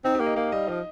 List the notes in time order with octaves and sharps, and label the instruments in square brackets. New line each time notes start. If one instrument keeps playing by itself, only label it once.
[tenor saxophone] C4 [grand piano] D#4
[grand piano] G4
[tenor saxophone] A#3
[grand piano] D#5
[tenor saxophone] A#3 [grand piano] F5
[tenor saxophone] G3 [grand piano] D#5
[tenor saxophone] F3 [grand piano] D#5